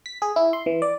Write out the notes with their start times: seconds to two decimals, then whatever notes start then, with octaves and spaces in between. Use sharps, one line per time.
0.06 B6
0.22 G#4
0.36 E4
0.53 C6
0.66 E3
0.82 D5